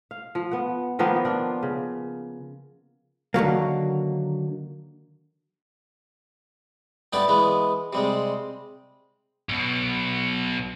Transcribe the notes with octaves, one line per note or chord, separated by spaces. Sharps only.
F5
F3
B3 F#5
D#3 F3 A#3 B3
D4 F4 D5
C#3
D3 D#3 F#3 A#3
G2 A3 B3 G4 D5 D6
E3 G#3 B3
C3 G3 G#3
B1 B2